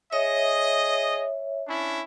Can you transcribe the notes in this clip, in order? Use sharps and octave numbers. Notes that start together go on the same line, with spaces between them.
G#4 C#5 D#5 E5
C#4 D4 E4